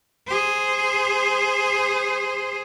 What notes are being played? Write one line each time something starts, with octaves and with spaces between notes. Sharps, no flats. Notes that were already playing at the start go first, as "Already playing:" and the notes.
G#4 C5